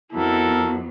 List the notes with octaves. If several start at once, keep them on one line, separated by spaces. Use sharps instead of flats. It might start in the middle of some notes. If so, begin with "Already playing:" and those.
F2 B3 E4 F#4 A4 A#4